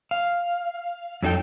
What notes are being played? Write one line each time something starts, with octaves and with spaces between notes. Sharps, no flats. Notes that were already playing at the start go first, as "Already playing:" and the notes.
F5
F2 F#3 D#4 A4 G5